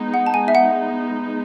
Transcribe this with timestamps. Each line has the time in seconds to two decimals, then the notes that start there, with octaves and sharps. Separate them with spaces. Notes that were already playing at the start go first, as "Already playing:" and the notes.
Already playing: G#3 B3 D#4
0.14 F#5
0.26 A5
0.34 G#5
0.48 E5
0.55 F#5